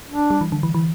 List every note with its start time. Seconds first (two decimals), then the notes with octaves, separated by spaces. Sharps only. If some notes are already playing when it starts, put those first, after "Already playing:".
0.09 D4
0.30 G3
0.41 E3
0.52 D3
0.63 E3
0.74 E3